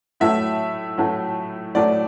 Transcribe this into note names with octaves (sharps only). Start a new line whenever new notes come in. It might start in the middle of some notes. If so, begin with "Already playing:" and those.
A2 F#3 A3 E5
A2 F#3 A3
A2 F#3 A3 D5